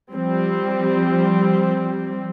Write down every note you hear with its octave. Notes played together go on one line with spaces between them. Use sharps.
F3 G3 C4